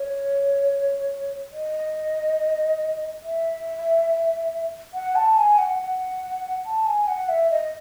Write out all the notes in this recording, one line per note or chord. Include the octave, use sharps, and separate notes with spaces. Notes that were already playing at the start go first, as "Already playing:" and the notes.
Already playing: C#5
D#5
E5
F#5
A5
G#5
F#5
F#5
A5
G#5
F#5
E5
D#5